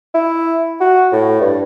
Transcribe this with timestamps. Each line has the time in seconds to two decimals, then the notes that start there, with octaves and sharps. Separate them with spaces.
0.15 E4
0.81 F#4
1.12 A2
1.41 G2